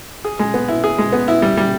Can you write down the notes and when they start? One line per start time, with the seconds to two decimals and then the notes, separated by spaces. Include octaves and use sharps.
0.24 G#4
0.39 G#3
0.54 B3
0.68 E4
0.84 G#4
0.98 G#3
1.13 B3
1.28 E4
1.42 G3
1.57 G3